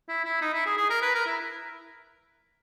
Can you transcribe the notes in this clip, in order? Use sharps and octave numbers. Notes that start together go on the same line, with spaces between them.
E4
E4
D#4
E4
G#4
G#4
A#4
B4
A#4
E4